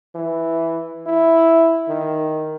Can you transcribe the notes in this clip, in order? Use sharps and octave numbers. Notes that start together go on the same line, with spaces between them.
E3
E4
D#3